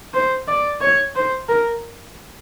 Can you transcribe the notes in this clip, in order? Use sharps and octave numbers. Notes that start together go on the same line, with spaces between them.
C5
D5
C#5
C5
A#4